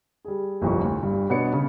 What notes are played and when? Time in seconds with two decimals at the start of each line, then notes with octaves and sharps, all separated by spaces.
0.25 G3 G#4
0.62 G1 C2 F2 C#6
0.84 D2
1.03 G2
1.30 B2 B3 D4 B4 C#5 C#7
1.53 C#3